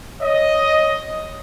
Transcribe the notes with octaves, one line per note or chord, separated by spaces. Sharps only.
C#5 D#5